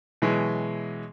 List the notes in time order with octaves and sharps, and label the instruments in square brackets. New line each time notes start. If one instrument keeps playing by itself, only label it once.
[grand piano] B2 E3 F#3 G#3